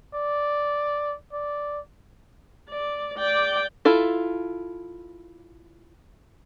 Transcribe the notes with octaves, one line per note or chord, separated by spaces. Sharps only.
D5
D5
D5
D5 G5
E4 F4 A4